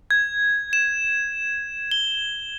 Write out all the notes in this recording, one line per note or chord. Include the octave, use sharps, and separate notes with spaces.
G#6
E7
G7